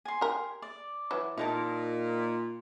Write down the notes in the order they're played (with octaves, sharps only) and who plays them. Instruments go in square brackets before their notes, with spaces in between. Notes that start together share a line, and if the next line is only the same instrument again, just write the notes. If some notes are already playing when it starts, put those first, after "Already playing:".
[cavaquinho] G#5 C6
[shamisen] G4 A#4
[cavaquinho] D5
[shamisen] E3 F#3 E4
[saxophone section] A#2 [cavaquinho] D#4 A#4 A5